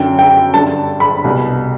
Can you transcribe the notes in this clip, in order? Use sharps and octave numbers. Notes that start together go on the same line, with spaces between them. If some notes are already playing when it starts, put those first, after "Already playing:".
Already playing: F#2 D3 G5
G5
G2 D3 A5
B5
C2 B2